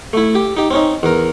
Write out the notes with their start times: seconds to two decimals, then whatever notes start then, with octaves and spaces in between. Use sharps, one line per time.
0.13 A3 E4
0.35 G4
0.57 D#4 G4
0.71 C4 C#4 D#4
1.03 E2 A#4